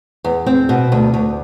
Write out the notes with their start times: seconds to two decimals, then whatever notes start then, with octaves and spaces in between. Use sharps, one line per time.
0.24 E2
0.46 C4
0.69 B2
0.92 D2
1.14 D2